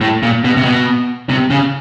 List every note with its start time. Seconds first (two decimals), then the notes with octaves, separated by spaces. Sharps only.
0.01 A2
0.23 A#2
0.44 B2
0.57 C3
0.65 B2
1.29 C3
1.50 C#3